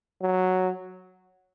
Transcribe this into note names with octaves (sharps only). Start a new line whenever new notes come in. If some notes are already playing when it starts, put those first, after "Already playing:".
F#3